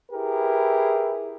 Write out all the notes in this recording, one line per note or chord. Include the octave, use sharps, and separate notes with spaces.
E4 G4 G#4 A#4 B4